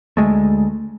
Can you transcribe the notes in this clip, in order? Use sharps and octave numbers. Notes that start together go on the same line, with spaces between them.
D2 G#3 A3